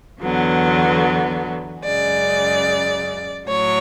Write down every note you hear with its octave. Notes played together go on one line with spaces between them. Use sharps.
E2 D3 F#3 B3
F#2 C#3 G#3 D5
A2 F#3 C#5